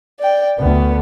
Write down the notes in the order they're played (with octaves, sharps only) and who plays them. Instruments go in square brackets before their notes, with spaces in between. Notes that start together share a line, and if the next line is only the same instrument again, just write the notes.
[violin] D5 G5
[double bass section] D2 [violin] B3